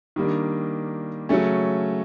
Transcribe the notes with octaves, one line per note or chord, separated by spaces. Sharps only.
D#3 G3 A#3 D4
C#3 F#3 A3 C#4